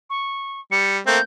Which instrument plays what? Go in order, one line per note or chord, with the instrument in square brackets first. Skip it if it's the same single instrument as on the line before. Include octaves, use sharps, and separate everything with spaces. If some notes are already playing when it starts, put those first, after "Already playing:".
[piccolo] C#6
[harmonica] G3 [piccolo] C#7
[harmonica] A3 A#3 C4 [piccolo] G6